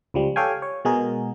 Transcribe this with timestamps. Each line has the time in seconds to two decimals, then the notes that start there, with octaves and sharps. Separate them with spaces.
0.14 C#2 F3 G3
0.36 G4 A4 C#5 F5 G5 G#5
0.62 C#5
0.85 B2 G#3 F#4 G#4 A#4